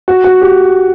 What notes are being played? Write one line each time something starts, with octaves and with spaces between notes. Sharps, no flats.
F#4
F#4
G4